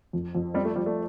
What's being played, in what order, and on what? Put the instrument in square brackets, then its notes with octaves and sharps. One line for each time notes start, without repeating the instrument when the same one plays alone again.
[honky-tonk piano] F2
F2
[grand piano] G3 C4 [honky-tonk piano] D5
[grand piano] A3
[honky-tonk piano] F3 [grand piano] G3
[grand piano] A3